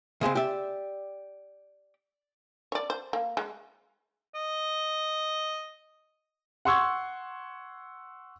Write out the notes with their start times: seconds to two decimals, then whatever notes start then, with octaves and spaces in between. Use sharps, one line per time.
0.21 C#3 G#3 A3 C4
0.35 G4 D5 E5
2.72 C#5 D5
2.90 C5
3.13 A#3
3.37 G#3
4.35 D#5
6.65 F#5 C6 C#6 E6 G#6